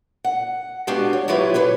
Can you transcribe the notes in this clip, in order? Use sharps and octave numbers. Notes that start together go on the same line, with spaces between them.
F#5
G#3 B3 D4 F#4 G4 F5
C#5
F#3 E4 F4 G4 B4 C#5
E3 A4 B4 C#5